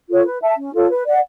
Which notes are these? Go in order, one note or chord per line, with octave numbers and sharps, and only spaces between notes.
F4 A4 C#5
B4
E5 A5
C#4
F4 A4 C#5
B4
D5 F#5